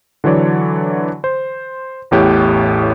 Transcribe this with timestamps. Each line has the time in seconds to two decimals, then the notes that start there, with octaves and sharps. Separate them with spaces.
0.24 D3 E3 F#3 C#5 D5
1.24 C5
2.11 A1 E2 A2 G4 C#5 F#6